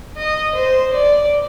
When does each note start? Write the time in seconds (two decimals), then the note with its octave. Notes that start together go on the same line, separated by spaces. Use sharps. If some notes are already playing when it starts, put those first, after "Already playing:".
0.17 D#5
0.54 C5
0.93 D5